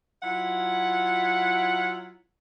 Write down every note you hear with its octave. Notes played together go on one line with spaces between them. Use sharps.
F#3 E4 F4 F#5